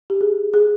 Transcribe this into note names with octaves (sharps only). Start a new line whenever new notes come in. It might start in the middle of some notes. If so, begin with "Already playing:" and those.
G4
G#4
G#4